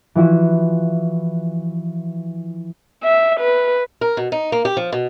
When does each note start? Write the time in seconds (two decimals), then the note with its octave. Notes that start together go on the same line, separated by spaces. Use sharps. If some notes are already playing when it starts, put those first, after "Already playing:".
0.15 E3 F3 E4 F#4
3.04 E5
3.40 B4
4.01 A#4
4.17 B2
4.32 D#4
4.52 A#3
4.65 G4
4.77 F3
4.92 B2